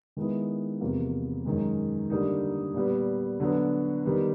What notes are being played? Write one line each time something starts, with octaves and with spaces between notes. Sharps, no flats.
D#3 G#3 B3 E4
E2 C3 F3 A#3
F#2 D#3 G#3
D3 G3 A#3 D#4
A#2 G3 B3
D3 F#3 B3
D#3 G3 B3